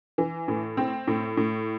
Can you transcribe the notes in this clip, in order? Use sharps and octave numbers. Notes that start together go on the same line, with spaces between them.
E3
A2
C4
A2
A2